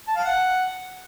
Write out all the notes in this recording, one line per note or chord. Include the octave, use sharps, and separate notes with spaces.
A5
F5
F#5